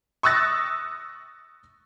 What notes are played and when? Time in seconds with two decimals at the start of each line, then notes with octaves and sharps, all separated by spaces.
0.23 C#6 D#6 E6 F#6 A6 A#6